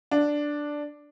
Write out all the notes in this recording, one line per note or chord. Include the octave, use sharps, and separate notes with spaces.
D4